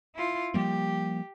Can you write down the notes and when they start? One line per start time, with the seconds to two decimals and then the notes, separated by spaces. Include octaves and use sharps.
0.15 E4 F4
0.54 F3 G3 A#3 G4